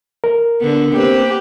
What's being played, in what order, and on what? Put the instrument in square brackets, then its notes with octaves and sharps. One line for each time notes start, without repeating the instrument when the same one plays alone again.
[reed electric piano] A#4
[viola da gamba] D3 B3
[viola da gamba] A#3 B4 [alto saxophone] C4 [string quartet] G4